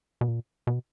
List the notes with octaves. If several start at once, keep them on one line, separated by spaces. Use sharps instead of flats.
B2
A#2
B2